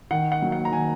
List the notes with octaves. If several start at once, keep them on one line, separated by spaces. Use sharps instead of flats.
D#3 F#5
F#5
F#3 A#3
F#5
A#5
D#3 G#5